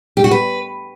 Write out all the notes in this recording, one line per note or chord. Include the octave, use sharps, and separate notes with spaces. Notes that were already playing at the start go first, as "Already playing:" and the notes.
G4
F#4
B4